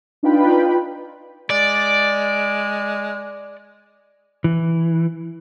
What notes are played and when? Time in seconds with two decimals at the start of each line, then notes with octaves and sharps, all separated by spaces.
0.23 D4 D#4 F4 B4 G5 B5
1.50 G#3 D5
4.44 E3